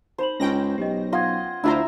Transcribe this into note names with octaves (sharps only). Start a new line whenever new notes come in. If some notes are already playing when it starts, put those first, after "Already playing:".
D#4 C5 B5 F#7
C#2 C#4 G5 A#6
B1 G4 D#5
F4 D#5 F5 F#5 G#6
D2 D4 E4 F4 C5 E5 A#5